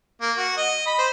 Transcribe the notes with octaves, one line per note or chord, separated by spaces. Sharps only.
A#3
F#4
D#5
B5
C5